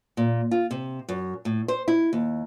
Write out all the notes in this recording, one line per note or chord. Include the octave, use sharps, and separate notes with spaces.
A#2
F4
C3
F#2
A2
C5
E4
D#2